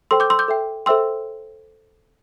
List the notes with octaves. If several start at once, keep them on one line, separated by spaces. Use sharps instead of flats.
A4 C5 G5 C6 E6
D6 G6
C6 E6
D6 G6
A4 E5 G5
A4 C5 E5 G5 C6 E6